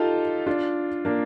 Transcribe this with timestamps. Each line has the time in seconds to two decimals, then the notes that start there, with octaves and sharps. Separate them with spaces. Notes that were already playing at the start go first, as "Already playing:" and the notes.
Already playing: D#4 F4 G4 A4
0.47 D4 F4
1.05 A#3 D4